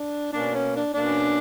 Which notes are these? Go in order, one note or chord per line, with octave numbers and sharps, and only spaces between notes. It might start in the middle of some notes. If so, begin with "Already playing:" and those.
Already playing: D4
B2 A#3 C#4 D4
C#4
D4
B2 A#3 C#4 D4